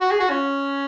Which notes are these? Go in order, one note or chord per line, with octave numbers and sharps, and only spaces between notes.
F#4
G#4
F#4
C#4